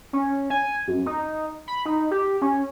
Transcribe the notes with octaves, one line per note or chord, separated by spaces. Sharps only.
C#4
G#5
F#2
D#4
B5
D#4
G4
C#4